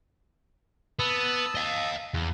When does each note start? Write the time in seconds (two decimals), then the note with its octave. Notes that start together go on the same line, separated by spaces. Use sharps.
0.99 B3 A5 D#6 E6
1.55 D#5 F5
2.14 E2